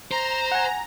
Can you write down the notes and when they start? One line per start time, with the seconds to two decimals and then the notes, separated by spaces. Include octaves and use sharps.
0.11 C5 A#5
0.52 F#5 G#5